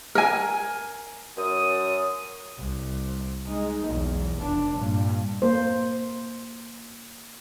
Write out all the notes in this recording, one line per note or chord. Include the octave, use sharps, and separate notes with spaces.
A#4 G#5
F#2 D#6
C2
G#3 D#4
B1 E2
F1 D4
G2 A#2
A#3 C5